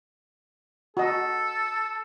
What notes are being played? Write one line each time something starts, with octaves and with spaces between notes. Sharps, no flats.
F#4 A4 D#5